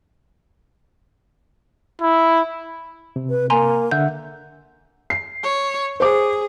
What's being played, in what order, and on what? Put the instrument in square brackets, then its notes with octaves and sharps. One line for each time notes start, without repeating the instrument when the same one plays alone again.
[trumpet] E4
[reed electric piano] C3
[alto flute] B4
[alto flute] A#3 [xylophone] G#5 A#5 C6
[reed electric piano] D3 E5 F#5 [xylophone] G6
[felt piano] C7
[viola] C#5
[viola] G#4 [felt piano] C5 D6